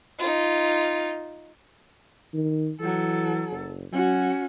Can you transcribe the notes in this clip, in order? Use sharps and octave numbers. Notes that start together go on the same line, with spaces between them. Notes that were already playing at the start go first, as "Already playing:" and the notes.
D#4 F4
D#3
E3 F#3 A4
F#1
F#3 C#4 F#4